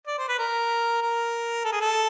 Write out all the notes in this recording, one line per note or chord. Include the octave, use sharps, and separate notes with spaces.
D5
C5
B4
A#4
A#4
A4
G#4
A4